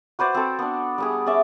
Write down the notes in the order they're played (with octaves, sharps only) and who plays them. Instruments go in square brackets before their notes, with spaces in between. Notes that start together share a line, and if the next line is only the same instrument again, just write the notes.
[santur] F#4 B4 C5 D5
C4 F#4 A4
B3 D4
G3 B3 G#4
C#4 G#4 D5 E5